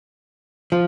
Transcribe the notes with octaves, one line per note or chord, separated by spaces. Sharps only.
F3